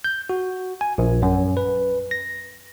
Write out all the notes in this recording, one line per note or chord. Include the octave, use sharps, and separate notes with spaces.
G6
F#4
G#5
A#1
F#2
B4
A#6